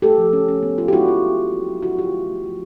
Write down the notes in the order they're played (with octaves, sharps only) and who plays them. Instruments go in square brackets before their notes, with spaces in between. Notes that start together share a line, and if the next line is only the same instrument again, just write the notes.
[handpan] A3 G4 A4
F3
C#4
C#4
B3
B3 F4
G4
G#3 E4 F#4
G#3 F4
A#3
C#4
F#3
F#3
D3 E4 F#4
F#3 F4 G4
A3
A3
F3